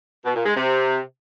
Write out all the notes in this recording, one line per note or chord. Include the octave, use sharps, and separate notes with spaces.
B2
A#2
G#3
C3